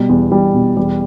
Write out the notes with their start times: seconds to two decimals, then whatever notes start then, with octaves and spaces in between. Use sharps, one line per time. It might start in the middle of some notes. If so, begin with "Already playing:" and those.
Already playing: B2 G3
0.09 E2
0.32 E2 G3
0.54 B2
0.77 E2 G3